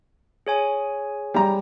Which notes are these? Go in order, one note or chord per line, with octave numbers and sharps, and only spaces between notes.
G#4 C#5 G#5
G3 A#5